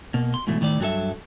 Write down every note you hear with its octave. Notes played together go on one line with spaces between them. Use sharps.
B2 A#3
C6
G#2 B2 E3 A3
A2 D#3 A3 D5
G2 F#3 G#4 A4 E5